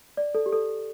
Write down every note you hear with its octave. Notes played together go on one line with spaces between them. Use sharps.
D5
A4
G4
A4